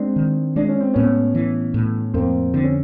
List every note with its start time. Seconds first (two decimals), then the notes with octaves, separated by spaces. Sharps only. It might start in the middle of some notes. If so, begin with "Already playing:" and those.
Already playing: G#3 C4 D4
0.16 D#3
0.56 G#3 D4
0.68 C#4
0.80 C4
0.94 A2 B3 C#4
1.35 E3
1.74 A2
2.14 F2 A#3 C4
2.54 D3 C4
2.64 C#4